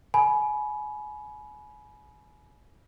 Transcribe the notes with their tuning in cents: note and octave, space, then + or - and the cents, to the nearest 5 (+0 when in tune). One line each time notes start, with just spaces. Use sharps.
G#5 +30 B5 -15